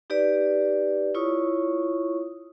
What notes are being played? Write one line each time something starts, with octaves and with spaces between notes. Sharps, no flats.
D#4 G4 B4 D5
E4 F4 C#5 C#6 D#6